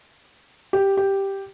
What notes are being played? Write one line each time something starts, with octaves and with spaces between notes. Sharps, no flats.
G4
G4